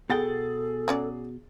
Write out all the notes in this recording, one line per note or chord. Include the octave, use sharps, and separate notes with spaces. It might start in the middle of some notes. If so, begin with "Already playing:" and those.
B2 G#4 A4 F#5 G5 A6
F#3 C#4 D5